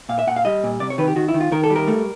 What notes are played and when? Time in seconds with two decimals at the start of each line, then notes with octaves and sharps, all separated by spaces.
0.09 A#2 F5
0.19 E5
0.27 A#2 F#5
0.36 F5
0.45 G3 D#5
0.64 A#2
0.80 C3 D5
0.90 C#5
0.98 D#3 B4
1.08 G4
1.16 D#3 F#4
1.28 E4
1.34 D#3
1.40 F4
1.52 D#3 A#4
1.64 A4
1.70 G3
1.76 A#4
1.88 A3